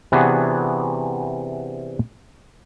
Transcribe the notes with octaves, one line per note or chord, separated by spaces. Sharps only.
C3 E3 B3 D4 F#4 G#4